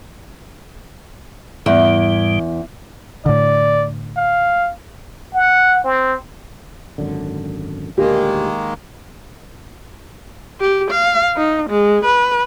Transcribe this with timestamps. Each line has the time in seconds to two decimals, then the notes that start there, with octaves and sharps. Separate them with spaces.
1.66 E2 G#2 G3
3.26 A2 D3 D5
4.17 F5
5.33 F#5
5.84 C4
6.98 G#1 F#2 D3
7.98 D2 A#2 D#3 G#3 A#3 G4
10.60 G4
10.91 F5
11.37 D#4
11.70 G#3
12.05 B4